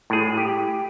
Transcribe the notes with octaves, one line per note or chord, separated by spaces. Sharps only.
A2 G#4
G4